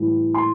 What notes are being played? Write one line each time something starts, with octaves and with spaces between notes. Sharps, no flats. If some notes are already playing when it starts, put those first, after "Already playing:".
Already playing: A2 E3 G3
C6